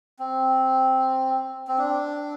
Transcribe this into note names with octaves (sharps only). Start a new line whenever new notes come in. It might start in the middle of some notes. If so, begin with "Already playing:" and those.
C4
C4
D4